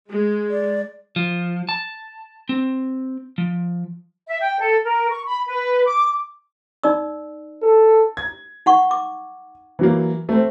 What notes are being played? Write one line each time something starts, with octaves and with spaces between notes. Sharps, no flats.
G#3
D5
F3
A5
C4
F3
E5
G5
A4
A#4
C#6
B5
B4
D6
D#4 D5 E6
A4
G#6
D#4 F#5 C#6
D6
E3 F#3 A#3
A3 C4